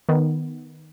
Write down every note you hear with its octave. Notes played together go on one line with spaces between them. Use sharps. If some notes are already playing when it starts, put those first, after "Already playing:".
D#3 B3